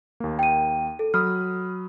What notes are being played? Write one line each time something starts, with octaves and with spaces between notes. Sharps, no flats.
D#2 A#3
G5 D#7
A4
F#3 B5 D#6 F6